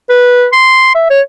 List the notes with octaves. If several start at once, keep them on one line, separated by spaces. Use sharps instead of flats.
B4
C6
E5
C#5